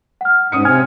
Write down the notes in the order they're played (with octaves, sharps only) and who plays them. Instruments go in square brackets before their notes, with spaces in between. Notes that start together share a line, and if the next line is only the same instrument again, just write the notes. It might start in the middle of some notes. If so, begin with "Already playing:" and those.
[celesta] F#5 F6
[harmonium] G#2 [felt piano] C#4 D#6 C#7
[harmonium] C3 C4 [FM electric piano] G#5 F6 G#6